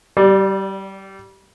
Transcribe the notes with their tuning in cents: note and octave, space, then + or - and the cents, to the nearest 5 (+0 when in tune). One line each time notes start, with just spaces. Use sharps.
G3 -20 D5 +10